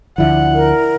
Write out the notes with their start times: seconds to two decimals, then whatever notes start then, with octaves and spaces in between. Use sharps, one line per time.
0.18 D2 D3 F3 E4 D5 E5 F#5
0.54 A#4